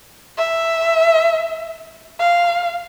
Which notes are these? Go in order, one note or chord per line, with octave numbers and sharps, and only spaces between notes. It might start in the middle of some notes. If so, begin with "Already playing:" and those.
E5
F5